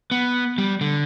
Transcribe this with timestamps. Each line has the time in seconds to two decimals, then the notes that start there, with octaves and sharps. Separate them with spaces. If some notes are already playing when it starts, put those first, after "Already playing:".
0.11 B3
0.58 G3
0.81 D3